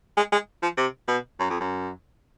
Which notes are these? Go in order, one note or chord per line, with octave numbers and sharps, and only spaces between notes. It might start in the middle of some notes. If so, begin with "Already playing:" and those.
G#3
G#3
F3
C3
B2
F#2
F2
F#2